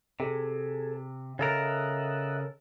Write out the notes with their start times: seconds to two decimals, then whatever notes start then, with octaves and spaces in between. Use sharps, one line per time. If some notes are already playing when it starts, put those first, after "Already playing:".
0.20 C3 G#4 A4
1.39 C#3 A4 A#4 D#5 E5 F#5